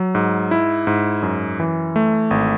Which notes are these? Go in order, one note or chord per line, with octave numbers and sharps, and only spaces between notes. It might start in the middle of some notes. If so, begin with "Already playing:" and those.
Already playing: F#3
G#2
E4
G#2
F#2
E3
A3
G#1